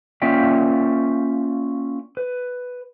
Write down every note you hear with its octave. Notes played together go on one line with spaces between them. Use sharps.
A#3 C#4 F4 D5 E5 G5
B4